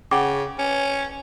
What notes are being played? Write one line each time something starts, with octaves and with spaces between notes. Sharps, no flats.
C#3 F#5 G5 D6
C#4